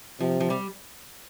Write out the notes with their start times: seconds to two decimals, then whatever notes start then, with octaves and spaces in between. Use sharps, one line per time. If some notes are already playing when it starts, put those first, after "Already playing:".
0.20 C3 F3
0.40 F3
0.50 G3